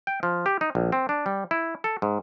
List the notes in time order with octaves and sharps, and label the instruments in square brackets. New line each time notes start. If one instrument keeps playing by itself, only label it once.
[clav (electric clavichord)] G5
F3
G4
D#4
A#1
C4
D4
G3
E4
A4
G#2